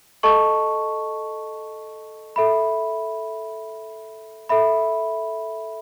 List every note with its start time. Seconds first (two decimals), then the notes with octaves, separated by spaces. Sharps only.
0.23 A4 D#5 A5 C#6
2.36 A4 E5 B5
4.49 A4 E5 B5